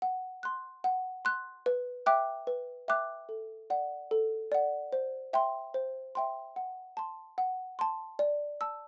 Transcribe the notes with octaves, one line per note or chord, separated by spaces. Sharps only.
F#5
C6 F#6
F#5
C6 F#6
B4
E5 G5 D6 F#6
B4
E5 G5 D6 F#6
A4
D5 F#5
A4
D5 F#5
C5
E5 G5 C6
C5
E5 G5 C6
F#5
A5 C6
F#5
A5 C6
D5
A5 E6